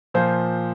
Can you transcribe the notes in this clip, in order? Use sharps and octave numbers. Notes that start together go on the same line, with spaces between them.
A#2 F3 C5